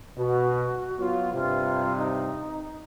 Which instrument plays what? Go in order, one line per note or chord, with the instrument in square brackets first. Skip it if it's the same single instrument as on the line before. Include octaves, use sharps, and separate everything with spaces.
[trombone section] B2 [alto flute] F#4
[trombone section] F#3 B3 F4
[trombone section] G2 C3 [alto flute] F4
[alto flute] D#4